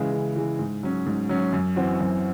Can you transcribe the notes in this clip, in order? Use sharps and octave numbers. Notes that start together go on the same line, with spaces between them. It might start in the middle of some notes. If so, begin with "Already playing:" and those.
Already playing: C#3 E3 G#3
C#3
E3 G#3
G#2
F#3 C#4
G#2
F#3 C#4
F#2
E3 C4 F#4
F#2